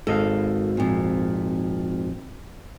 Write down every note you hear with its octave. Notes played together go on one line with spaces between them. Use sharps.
G#1 A4 D#5 F5
F2 A#2